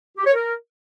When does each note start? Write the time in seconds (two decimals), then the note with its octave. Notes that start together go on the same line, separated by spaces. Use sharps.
0.17 G4
0.26 C#5
0.34 A#4